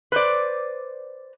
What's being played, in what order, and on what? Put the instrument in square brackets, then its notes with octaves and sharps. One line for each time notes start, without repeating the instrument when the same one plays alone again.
[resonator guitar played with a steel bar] B4 C5 D5